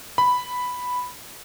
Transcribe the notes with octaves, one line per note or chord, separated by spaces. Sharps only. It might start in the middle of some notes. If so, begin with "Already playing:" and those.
B5